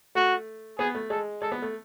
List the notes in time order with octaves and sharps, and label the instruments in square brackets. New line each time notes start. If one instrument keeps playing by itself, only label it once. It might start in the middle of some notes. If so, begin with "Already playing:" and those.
[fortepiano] A3 [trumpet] F#4
[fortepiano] B3 [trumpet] G#4
[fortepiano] A3
[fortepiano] G#3 [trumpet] A4
[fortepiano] G#3 [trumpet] A4
[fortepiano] B3
A3